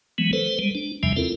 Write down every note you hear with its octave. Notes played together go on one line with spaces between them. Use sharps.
E3 F#3 G#3 B3
A4 B4 C5
G3 G#3
D4
E2 C3 F3 G3 E5 G#5
C4 E4 F4 A4 A#4